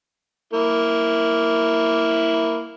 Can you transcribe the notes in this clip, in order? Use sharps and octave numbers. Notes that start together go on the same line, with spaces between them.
A#3 E4